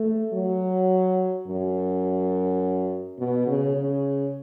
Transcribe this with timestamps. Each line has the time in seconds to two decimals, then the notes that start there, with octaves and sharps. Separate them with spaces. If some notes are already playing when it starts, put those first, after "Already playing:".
Already playing: A3
0.33 F#3
1.47 F#2
3.19 B2
3.47 C#3
3.76 C#3